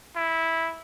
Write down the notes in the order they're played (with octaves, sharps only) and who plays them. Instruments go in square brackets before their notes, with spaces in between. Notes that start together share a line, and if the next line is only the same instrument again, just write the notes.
[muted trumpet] E4